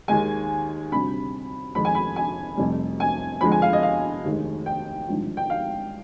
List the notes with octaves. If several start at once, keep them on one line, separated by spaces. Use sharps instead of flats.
D#2 D#3 G#3 G#5
D2 C3 G3 B5
F2 D#3 G#3 B5
G#5
B5
G#5
F1 F2 C3 G3
G#5
F2 D3 F3 G#3 B5
G#5
F5
D#5
F5
F1 D#2 D#3 G#3
G5
G#1 G2 D3 F3
G5
F5